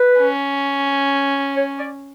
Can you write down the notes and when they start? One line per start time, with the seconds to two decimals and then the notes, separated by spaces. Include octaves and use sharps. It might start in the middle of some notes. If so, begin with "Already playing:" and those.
Already playing: B4
0.20 C#4
1.56 C#5
1.79 D5